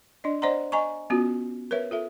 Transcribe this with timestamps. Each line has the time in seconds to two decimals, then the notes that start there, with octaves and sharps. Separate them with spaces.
0.24 D4 D5 D#5
0.42 C5 D5 D#5 F#5 A#5 C6
0.72 D#5 G#5 A#5 C#6
1.10 B3 C#4 F4 F#4
1.71 A#4 B4 C#5 E5
1.91 F4 A4 E5